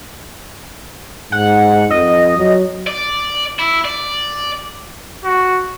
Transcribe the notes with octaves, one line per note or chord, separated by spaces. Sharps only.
G#2 F#5
F2 D#5
F#3
D5
E4
D5
F#4